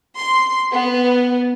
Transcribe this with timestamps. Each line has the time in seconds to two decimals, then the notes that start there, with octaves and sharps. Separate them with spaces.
0.18 C6
0.72 B3